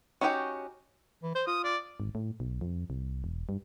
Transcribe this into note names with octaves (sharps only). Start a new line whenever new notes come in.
C#4 D#4 F#4 G4 G5
E3
C5
F4 D#6
D5
G#1
A2
B1
F2
C2
E1
G2